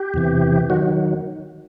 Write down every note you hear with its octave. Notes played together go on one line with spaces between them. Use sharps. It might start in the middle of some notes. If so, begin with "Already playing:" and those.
Already playing: G4
E2 C3 E3
D#3 F#3 F#4